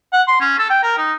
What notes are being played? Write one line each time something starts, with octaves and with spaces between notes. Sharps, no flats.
F#5
C6
C#4
A4
G5
A#4
D#4